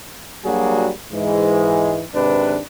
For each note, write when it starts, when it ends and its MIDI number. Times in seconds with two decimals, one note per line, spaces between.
0.45 0.89 54
0.45 0.89 55
0.45 0.89 58
0.45 0.89 62
0.45 0.89 66
0.45 0.89 68
1.12 2.03 44
1.12 2.03 52
1.12 2.03 56
2.14 2.58 44
2.14 2.58 48
2.14 2.58 51
2.14 2.58 62
2.14 2.58 71